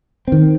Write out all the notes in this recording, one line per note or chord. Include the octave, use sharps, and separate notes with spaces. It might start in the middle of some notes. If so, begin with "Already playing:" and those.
D#3 C4